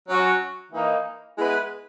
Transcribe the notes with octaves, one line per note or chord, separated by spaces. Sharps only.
F#3 C#4 F#4
E3 A#3 D#4
G#3 B3 E4 B4